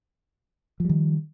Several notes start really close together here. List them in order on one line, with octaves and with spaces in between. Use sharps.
F3 G3 D#3